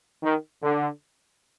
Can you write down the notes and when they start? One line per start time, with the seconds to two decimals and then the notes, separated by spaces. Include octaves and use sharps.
0.23 D#3
0.63 D3